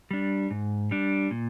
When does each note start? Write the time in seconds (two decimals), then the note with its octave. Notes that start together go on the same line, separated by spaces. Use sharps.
0.11 G3 D4
0.51 G#2
0.91 G3 D4
1.31 A#2